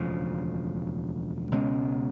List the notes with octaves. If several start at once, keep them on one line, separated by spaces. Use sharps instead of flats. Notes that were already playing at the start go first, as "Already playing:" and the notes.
Already playing: E1 D2 C#3 F3
C#2 B2 G#3 C#4